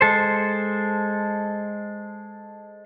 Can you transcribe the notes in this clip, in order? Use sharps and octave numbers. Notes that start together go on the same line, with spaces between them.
G#3 A4 C5